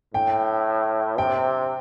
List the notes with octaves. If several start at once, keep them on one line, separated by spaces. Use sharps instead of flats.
A2 G5
C3 G5